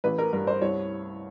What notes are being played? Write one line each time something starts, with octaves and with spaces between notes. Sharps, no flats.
A1 B4
A#4
G2 A#4
C5
C2 C#5